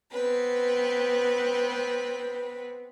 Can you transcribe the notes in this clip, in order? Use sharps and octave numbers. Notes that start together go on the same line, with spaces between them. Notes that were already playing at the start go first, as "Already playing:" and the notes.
B3 C4 B4